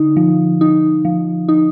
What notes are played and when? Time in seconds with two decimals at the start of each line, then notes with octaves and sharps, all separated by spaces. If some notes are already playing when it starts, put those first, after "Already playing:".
Already playing: D3 D#4
0.17 F3
0.61 D#4
1.05 F3
1.49 D#4